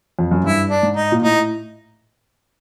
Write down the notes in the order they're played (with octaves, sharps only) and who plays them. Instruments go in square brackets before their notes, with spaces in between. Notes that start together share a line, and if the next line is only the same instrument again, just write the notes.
[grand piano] F2
F#2
[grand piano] G2 [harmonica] E4
[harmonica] D4
[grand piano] G#2
[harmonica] D#4
[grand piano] A#2
[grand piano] A2 [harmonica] D#4